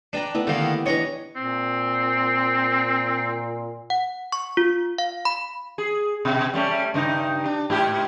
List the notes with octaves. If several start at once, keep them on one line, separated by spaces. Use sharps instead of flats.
D4 B4 G5 A#5
A3 B3 E4
D3 D#3 A#3 G4
E3 D4 C#5 D#5 A#5
A#2 C4
F#5
C#6
F4
F5
B5
G#4
B2
G3 A3 C#4
G2 C#3 D#4
D4
G#2 G4